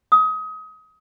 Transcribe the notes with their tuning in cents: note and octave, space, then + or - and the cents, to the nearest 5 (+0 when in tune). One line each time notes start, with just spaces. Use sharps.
D#6 +25